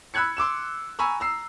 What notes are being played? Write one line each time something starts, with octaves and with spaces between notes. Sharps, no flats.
B5 E6 F#6 G#6 C#7
C6 D6 E6 E7
G#5 A#5 B5 C#6 E6
A#5 E6 C7